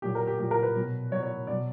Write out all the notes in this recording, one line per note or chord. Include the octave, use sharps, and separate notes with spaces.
A#2 F#3 G4
A#4
G4
A#2 F#3 G4
A#4
B4
B2 F#3
B2 F#3 C#5
C#5
B2 F#3 D5